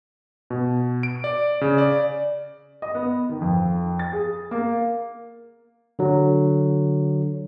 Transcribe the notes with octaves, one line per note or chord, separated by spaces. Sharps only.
B2
D7
D5
C#3
D5
D#5
B3
D#3
F2
A6
G#4
A#3
D3 F#3